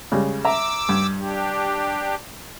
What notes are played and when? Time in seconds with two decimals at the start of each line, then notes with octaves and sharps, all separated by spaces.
0.12 C#3 G3 G#3
0.45 E5 A#5 D6 E6
0.89 G2
1.18 D4 G4